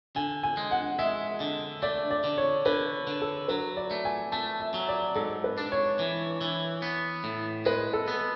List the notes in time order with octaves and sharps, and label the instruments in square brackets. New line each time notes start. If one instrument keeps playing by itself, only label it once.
[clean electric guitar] D3 [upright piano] G#5
[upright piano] G#5
[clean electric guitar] G#3
[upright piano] F#5
[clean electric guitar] G#3 [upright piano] E5
[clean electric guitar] D3
[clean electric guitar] A3 [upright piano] D5
[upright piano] D5
[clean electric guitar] D3
[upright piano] C#5
[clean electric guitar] D3 [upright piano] B4
[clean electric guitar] D3
[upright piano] A4
[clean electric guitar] F#3 [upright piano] B4
[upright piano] D5
[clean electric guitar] A3
[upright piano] G#5
[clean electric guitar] A3 [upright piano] A5
[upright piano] E5
[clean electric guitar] F#3
[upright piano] D5
[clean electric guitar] G#2 [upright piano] A4
[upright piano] B4
[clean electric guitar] D4
[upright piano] C#5
[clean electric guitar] E3
E3
B3
A2
[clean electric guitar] G#3 [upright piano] B4
[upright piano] A4
[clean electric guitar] B3